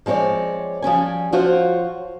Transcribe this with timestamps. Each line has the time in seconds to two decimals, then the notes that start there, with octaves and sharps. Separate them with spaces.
0.06 F3 G#3 C4 C#5 D5
0.82 F3 G3 C#4 G#5
1.32 F3 F4 F#4 C5 C#5